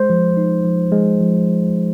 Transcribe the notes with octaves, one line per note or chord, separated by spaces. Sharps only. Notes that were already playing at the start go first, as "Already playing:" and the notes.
Already playing: G#3 C5
F3
D#4
F3
G#3
F3